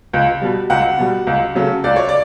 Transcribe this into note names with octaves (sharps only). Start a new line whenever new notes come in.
C#2
B2 G3
C#2 F#5
B2 G3
C#2
C#3 F#3 A3
C#2 D5
C#5
D5